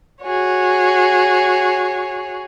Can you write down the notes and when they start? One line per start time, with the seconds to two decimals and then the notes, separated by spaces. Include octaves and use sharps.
0.25 F#4 G#4 C#5